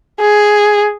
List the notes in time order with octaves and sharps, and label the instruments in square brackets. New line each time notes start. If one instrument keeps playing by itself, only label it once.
[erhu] G#4